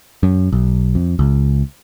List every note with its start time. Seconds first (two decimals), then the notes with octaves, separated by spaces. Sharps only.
0.23 F#2
0.52 B1
0.95 F2
1.19 C#2